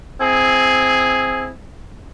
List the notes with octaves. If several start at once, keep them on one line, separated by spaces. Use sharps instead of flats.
C4 E4 G#4